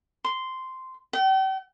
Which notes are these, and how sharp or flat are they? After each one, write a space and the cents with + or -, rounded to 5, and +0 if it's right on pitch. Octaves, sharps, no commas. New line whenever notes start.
C6 -10
G5 -40